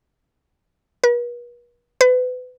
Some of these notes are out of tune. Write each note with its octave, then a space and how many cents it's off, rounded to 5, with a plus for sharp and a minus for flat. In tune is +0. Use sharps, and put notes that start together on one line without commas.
B4 -45
B4 +30